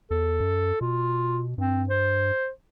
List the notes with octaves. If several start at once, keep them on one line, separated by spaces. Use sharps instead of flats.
E2 A4
F#2
B2 F4
G2 C4
C5